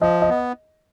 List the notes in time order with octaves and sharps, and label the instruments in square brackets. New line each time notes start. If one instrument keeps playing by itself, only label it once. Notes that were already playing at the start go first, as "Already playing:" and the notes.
[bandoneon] F3 [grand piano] D#5
[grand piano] D#5
[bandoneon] B3